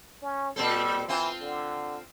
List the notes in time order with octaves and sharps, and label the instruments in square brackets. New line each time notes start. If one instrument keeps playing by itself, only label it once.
[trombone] C#4
[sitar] A#2 C4 A4 [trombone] G3
[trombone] E3 [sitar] C4 F4 C5
[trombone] D3